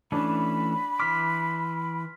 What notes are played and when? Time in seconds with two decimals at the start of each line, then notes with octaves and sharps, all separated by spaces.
0.12 E3 A3 C#4 D4 B5
1.00 E3 C6 D6 F6 B6